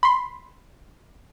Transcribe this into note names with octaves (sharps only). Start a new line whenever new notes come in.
B5 C6